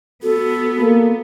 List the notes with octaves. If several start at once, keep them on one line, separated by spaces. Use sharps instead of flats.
B3 F#4 A4
A#3